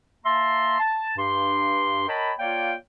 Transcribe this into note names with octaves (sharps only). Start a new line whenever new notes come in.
A#3 E5 A5 A#5 C6
A5
G2 G4 C6
A#4 C#5 D#5 G5 A5 B5
A#3 F4 C#5 D5 F5 G5